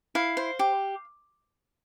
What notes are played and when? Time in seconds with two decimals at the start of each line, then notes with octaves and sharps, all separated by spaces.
0.15 E4 F5
0.37 C5
0.59 G4